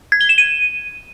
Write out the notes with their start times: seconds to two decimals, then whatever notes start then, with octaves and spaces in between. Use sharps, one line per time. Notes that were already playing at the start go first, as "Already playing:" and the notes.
0.12 G#6
0.21 G7
0.29 E7
0.38 D#7